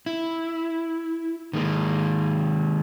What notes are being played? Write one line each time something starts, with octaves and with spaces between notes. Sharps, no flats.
E4
D#3 G#3 A#3